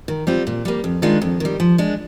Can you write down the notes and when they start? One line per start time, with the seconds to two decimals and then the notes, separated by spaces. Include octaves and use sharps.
0.08 D#3
0.27 G3 C4 F4
0.47 A#2
0.65 G3 A#3
0.84 F2
1.02 D#3 G#3 D4 F4
1.22 F2
1.40 D#3 G3
1.60 F3
1.78 G#3 D4